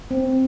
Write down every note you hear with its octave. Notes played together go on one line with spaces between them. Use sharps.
C4